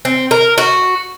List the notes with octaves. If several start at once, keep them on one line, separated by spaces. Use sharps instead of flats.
C4
A#4
F#4